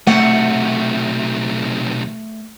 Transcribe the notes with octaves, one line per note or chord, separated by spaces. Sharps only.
B1 C3 A3 F#5